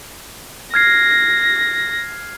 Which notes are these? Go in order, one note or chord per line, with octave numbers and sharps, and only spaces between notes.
F6 G#6 A#6 C7